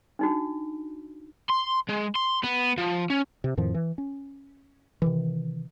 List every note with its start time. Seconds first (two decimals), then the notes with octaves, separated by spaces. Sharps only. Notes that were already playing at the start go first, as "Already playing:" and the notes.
0.19 D4 D#4 F#4
1.50 C6
1.89 G#3
2.16 C6
2.43 B3
2.78 F3
3.10 C#4
3.44 C3
3.57 F2 A2 D#3 F3
3.74 E3
3.98 C#4
5.02 C3 D#3 E3